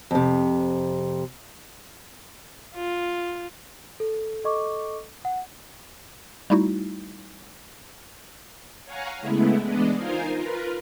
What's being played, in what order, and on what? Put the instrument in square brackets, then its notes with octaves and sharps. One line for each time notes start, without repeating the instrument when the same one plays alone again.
[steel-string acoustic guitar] F2 C3
[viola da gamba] F4
[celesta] A4
A4 D#5 C#6 D6
F#5
[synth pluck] G3 A3 D#4 E4 F#4
[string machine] C#5 F5 F#5 G#5 A#5
C#3 G#3 A3 B3 E4
E3 G#3 B3 D4 D5 D#5
D#4 F4 A#4 C5 F5 G#5
F4 A#4 B4